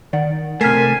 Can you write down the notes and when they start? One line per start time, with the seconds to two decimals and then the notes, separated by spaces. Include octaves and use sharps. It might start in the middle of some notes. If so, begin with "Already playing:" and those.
0.13 D#3 D5 F#5
0.61 C3 A3 A#4 G#5 F6 B6 C7